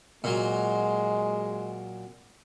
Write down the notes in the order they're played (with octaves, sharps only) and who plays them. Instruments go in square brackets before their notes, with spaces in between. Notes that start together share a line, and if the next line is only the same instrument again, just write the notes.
[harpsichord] A#2 F#3 [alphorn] G#3